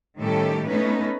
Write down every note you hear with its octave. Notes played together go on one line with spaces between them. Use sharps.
A2 D#3 G3 C#4 G4 A4
A3 B3 C#4 D#4 B4